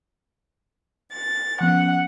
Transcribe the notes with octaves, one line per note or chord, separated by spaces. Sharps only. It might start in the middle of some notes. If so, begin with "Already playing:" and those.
A6
F3 B3 C#4 F#5